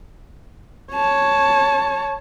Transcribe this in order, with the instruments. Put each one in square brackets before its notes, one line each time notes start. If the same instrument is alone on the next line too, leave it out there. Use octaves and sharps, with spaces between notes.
[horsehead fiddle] C#5 A5